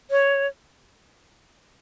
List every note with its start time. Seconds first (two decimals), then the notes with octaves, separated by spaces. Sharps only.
0.11 C#5